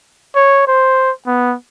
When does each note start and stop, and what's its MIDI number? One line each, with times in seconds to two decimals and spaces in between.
0.35 0.64 73
0.67 1.11 72
1.27 1.55 59